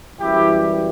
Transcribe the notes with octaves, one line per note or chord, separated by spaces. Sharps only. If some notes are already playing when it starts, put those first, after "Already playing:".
F#2 E3 G3 E4 G4